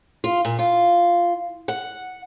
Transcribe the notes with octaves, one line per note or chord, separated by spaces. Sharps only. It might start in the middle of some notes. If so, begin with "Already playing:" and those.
F4
A#2
F4
F#5